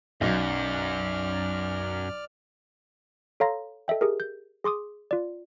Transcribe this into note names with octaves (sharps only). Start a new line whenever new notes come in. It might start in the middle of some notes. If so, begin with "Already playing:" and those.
B1 F#2 D5 F6
A4 C#5 F5 A#5 C6 A#6
A4 D#5 E5 G5
G4 G#4 A#4
G6
G#4 C6 D6 D#6
F4 D5